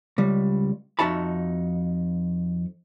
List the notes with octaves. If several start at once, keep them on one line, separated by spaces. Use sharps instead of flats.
C#2 G3
F2 D#4 F#4 E5 A5 B5